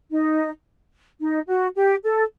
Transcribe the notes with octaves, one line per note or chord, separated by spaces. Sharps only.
D#4
D#4
F#4
G4
A4